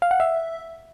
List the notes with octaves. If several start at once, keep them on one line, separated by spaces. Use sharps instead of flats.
F5
F#5
E5